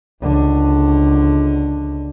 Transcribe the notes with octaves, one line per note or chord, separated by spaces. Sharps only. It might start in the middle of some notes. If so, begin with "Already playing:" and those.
C#2 D3